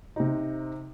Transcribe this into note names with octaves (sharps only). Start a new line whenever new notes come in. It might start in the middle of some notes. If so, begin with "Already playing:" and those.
C3 D#4